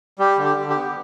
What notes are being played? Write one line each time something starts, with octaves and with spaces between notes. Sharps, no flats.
G3 G4
D3
G4
D3
G4
B3